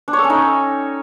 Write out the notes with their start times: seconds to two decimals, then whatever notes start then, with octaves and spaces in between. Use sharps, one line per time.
0.08 D4
0.13 C#5
0.19 A4
0.24 C#4
0.30 D#4